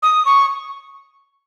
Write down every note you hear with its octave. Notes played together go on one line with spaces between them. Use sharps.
D#6
C#6